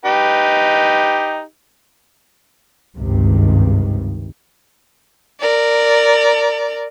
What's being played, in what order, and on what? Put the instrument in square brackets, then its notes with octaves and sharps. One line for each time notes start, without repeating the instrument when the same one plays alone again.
[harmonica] D#4 G4 B4
[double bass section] G#1 C#2 G2 C3 D#3
[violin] A#4 D5